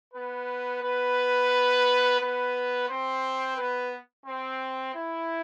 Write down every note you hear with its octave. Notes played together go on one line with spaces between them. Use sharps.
B3 B4
B3 B4
B3 B4
C4 C5
B3 B4
C4
E4